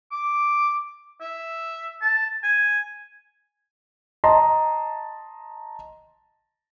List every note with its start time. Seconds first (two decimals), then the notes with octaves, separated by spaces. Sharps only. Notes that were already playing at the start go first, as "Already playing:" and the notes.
0.12 D6
1.21 E5
2.02 A5
2.43 G#5
4.24 D#5 A5 A#5 C6